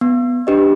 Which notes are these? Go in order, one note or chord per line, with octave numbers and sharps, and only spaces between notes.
B3
D4 G4 B4 D#5